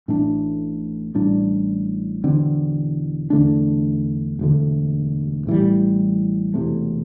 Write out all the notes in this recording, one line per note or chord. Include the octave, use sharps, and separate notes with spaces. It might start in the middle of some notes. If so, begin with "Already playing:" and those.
A1 A2 A3 D4
A1 A2 G3 D4
E1 E2 D3 C4
E2 D3 A3 D4
E1 D2 D3
A1 A2 E3 G3
E1 E2 C3 A3